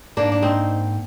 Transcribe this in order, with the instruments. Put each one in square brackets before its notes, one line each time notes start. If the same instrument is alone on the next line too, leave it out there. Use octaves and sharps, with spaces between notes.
[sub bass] G#2 [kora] A#3 D4
[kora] D4
C4 D#4